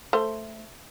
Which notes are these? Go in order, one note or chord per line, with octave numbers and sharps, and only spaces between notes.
A3 C5